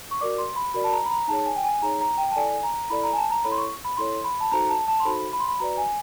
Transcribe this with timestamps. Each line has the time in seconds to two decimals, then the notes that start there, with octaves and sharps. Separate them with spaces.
0.11 C#6
0.21 F#4 A#4 D5 D6
0.38 C6
0.56 B5
0.74 F#4 A#4 D5 B5
0.84 A5
0.93 A#5
1.05 B5
1.10 A#5
1.28 D#4 G#4 C#5 A5
1.46 G#5
1.56 G5
1.64 G#5
1.82 D#4 G#4 C#5 A#5
2.01 A#5
2.18 G5
2.31 A5
2.36 E4 A4 D5 G#5
2.63 A#5
2.90 E4 A4 D5 B5
3.04 A#5
3.13 G#5
3.17 A5
3.31 A#5
3.44 E4 A4 C#5 B5
3.52 C6
3.58 C#6
3.85 B5
3.97 E4 A4 C#5 C6
4.24 B5
4.41 A5
4.52 D#4 F#4 A4 C5 A#5
4.69 A5
4.88 A5
5.00 C6
5.05 D#4 F#4 A4 C5 B5
5.33 B5
5.40 C6
5.48 B5
5.59 F#4 B4 D5 A#5
5.77 G#5